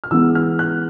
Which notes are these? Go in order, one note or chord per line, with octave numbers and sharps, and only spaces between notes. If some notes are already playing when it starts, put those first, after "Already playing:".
F6
E3 G#3 B3 E6
F6
F#6